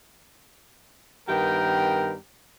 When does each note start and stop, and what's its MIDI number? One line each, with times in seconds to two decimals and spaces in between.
1.29 2.16 43
1.29 2.16 51
1.29 2.16 59
1.29 2.16 67
1.29 2.16 70
1.29 2.16 79